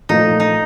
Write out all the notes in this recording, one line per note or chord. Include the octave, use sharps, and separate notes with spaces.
A#2 F3 A3 D#4
D#4